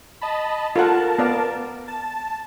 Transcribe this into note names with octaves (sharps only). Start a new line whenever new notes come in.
D#5 A5 B5
F4 A4 A#4 F#5 A5
B3 D5 F5
A5